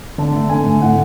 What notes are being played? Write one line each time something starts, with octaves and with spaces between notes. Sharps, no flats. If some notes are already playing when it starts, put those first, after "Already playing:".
D3 A5
A3
D3 G#5
A3
A2 F#5